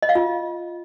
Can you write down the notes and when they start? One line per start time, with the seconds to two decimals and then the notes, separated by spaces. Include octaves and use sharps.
0.02 D#5
0.09 F5
0.15 F4